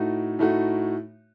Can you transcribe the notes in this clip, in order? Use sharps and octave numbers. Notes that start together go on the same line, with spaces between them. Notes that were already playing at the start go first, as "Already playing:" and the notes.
Already playing: A2 A3 D#4 F#4
A2 A3 D#4 F#4